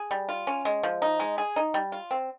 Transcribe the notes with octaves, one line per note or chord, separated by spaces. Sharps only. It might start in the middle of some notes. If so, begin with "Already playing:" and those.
Already playing: G#4
G3
F4
C#4
G#3
F3
D#4
G#3
G#4
D#4
G3
F4
C4